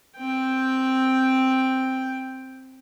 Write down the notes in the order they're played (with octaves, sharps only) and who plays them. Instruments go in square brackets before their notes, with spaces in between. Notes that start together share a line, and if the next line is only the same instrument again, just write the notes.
[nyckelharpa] C4 G5